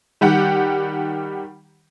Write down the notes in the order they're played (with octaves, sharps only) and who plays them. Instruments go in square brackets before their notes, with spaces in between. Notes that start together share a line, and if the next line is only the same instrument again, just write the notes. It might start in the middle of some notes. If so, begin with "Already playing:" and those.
[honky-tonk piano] D#3 G3 G4 F#5